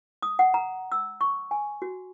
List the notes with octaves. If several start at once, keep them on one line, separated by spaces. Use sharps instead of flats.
D#6
F#5
A#5
E6
C#6
G#5
F#4